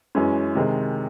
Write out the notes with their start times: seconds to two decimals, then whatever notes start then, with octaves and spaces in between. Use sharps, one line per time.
0.15 F#2 E3 G#3 C#4
0.55 C3 D#3 G#3